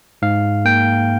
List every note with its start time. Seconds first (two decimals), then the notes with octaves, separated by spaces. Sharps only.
0.22 G#2 F5
0.65 A#3 G5